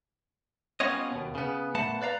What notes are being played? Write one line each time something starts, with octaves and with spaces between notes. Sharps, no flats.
G3 B3 C#4 F4 C#5 D#5
D#2 B2
C#3 B3
A#2 A3 B3 F#5 A5
B4 D5 F5 A#5